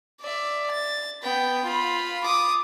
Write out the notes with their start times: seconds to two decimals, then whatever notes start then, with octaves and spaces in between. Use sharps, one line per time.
0.21 D5 E5
0.71 A6
1.22 B3 G5
1.65 F4 B5
2.24 D6 D#6